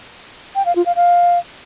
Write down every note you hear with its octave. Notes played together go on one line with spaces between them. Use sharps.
G5
F5
F4
F5
F5